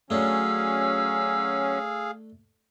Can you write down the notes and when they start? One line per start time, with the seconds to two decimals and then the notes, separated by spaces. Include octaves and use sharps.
0.10 F#3 A3 C#4 D4 G#4 F5 E6